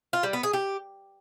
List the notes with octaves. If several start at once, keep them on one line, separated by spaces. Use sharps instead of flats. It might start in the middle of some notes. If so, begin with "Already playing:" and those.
F4
G3
B3
G#4
G4